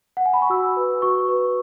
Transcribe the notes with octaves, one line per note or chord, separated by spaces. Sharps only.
F#5
G#5
B5
C#6
F#4 E6
B4
F#4 C#6
B4